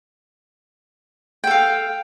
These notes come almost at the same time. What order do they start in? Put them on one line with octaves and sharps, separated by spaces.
G5 A4 F5